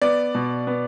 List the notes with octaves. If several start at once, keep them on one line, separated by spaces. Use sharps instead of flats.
B3 D5
B2
B3